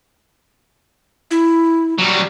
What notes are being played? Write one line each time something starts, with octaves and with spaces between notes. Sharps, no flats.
E4
F#3 G3